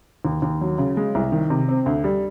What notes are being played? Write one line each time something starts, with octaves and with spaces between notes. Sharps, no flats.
D#2
D#2
F#3
C#3
G#3
C2
D#3
C3
C4
D2
G3